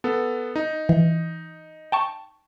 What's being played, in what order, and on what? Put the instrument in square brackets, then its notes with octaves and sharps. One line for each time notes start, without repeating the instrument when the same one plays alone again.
[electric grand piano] B3 A4
D#4
[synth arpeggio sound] E3
G5 A5 C#6